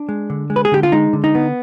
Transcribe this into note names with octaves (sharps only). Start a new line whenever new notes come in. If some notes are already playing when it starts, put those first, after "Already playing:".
Already playing: D4
G#3
D3
G#3
B4
G#4
D3 G4
F4
G#3 D#4
D3
D#4
B3